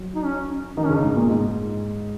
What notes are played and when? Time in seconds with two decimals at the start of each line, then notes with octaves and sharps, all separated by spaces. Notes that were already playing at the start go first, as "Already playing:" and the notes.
Already playing: F#3
0.15 D#4
0.25 C#4
0.77 D#3 D#4
0.86 C#3 C#4
0.96 D#4
1.03 G#2
1.16 A#2
1.30 G#2